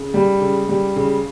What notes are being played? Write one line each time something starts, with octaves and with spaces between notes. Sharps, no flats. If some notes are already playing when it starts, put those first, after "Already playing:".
Already playing: C#3
G3
C#3
G3
C#3